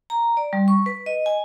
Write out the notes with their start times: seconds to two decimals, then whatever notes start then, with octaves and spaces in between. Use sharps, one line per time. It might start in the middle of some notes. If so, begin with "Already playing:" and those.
0.10 A#5
0.37 D5
0.53 G3
0.68 C#6
0.86 B4
1.06 D#5
1.26 G#5